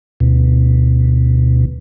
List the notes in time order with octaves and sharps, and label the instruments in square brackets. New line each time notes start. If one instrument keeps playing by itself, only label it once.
[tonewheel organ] D2 B2